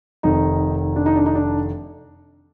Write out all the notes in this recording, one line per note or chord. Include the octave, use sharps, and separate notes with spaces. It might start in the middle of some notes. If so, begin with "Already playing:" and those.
F1 F2 D#3 D#4
D4
D#4
D4
D#4
D4